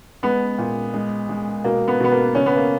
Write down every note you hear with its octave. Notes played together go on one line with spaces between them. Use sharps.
G#3 B3
A#2
G#3
G#3
B2 A#3
B3
B2 B3
A#3
C#3 C#4
B3
A#3